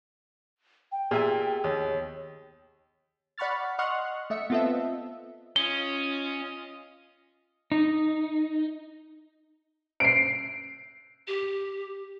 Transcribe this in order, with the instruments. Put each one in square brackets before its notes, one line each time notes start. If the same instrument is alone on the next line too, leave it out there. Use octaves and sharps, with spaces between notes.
[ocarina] G5
[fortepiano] A#2 E5 G#5 [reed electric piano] B3 G4 G#4
[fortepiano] D#2 [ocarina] C#5
[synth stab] D5 F#5 B5 C#6 F6 A6
D#5 F#5 C6 C#6 F6 F#6
A3 D#5 E5 C#7
B3 C4 F4 A4 D#5 E5
[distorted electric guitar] C#4 [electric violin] F4 D#5 [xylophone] G7
[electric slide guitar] D#4
[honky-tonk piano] C7 D7
[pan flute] G4